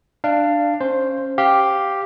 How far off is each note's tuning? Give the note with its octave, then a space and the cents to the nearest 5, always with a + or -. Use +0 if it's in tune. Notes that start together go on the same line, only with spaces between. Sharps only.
D4 +10 F5 -15
C#4 -15 C5 +5
G4 +0 F5 +0